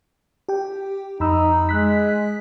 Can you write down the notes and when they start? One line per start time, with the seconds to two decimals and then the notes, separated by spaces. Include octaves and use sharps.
0.49 G4 G5
1.20 F2 D#4 B5 E6
1.69 G#3 F#6 B6